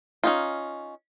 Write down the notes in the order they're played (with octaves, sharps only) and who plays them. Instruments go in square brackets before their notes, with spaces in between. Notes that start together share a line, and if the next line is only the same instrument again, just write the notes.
[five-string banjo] C#4 D#4 F4